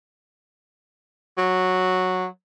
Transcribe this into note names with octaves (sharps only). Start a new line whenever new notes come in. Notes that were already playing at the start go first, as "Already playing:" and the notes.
F#3